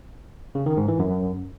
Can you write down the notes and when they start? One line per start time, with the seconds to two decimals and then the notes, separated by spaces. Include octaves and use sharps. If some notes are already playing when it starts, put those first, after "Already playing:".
0.55 C#3
0.66 D#3
0.77 G#2
0.88 E3
0.99 F#2